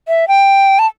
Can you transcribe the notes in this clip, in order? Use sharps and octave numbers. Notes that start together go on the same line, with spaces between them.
E5
G5
A5